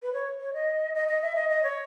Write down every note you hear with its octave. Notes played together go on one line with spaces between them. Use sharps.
B4
C#5
C#5
D#5
D#5
D#5
E5
D#5
D#5
C#5